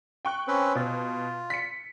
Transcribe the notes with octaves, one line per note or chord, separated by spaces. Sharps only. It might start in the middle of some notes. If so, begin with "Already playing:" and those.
G5 C#6 F#6
C4 C#4 B4
B2 F4
B6 C#7